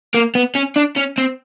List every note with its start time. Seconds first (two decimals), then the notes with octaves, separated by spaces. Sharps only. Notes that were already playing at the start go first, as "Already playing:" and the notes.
0.15 A#3
0.35 B3
0.55 C#4
0.76 D4
0.96 C#4
1.18 C4